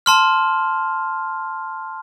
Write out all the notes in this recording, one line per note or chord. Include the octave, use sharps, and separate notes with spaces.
A5 C6 F6